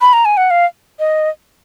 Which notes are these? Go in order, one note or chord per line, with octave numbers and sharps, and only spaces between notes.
B5
A#5
G#5
F#5
F5
D#5